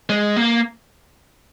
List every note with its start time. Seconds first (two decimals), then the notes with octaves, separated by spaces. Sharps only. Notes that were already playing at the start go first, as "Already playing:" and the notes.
0.10 G#3
0.36 A#3